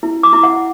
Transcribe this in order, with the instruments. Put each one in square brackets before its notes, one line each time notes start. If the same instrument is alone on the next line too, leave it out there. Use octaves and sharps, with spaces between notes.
[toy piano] E4
D6
E4
F#5